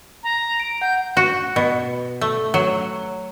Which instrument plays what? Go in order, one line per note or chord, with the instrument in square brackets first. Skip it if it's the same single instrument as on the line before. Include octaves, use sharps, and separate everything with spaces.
[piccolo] A#5
[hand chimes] D7
[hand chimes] F#5 [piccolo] G6
[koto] F#4
B2
A3
F#3